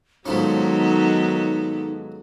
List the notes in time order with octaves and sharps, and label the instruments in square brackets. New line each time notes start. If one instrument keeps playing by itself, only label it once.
[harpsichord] G#2 F3 C#4 [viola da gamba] D#3 B3 A4 [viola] F#3 [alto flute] D#4